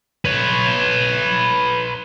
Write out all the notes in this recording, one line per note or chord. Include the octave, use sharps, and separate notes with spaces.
B4 C#5